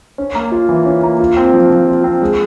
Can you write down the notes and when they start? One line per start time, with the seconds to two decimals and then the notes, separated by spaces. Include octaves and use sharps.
0.18 C#4
0.35 A#3
0.52 F4
0.69 E3
0.86 C#4
1.03 A#3
1.20 F4
1.37 C4
1.54 F3
1.70 F3
1.88 F4
2.04 C4
2.21 G#3